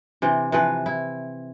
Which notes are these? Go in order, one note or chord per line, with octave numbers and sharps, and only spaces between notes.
C3 E3 C4
C3 E3 F3 B4
E4